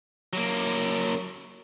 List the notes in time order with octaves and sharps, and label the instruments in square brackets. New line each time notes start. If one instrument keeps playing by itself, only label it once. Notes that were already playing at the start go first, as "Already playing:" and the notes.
[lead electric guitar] F#3 A#3